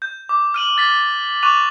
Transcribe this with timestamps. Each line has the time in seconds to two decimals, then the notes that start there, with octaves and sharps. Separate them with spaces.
0.02 G6
0.29 D6
0.54 F6 D#7 F#7
0.77 F6 A6 B6
1.43 C#6 D6 F#6 D#7 F7